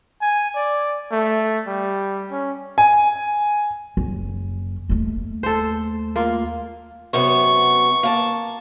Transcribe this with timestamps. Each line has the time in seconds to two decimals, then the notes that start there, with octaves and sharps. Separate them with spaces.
0.21 G#5
0.55 D5
1.11 A3
1.67 G3
2.31 C#4
2.78 G#5
3.97 F#1
4.89 D#2 A3
5.43 A4 C5
6.16 A#3 F4
7.13 F#2 C3 B3 C#6
8.03 A#3 A5